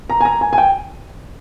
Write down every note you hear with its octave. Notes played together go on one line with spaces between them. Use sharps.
A#5
G#5
A#5
G#5
G#5
G5